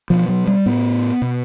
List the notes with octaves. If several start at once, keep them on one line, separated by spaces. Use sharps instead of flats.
B2 F3
F#3
G3
A2 B3
B2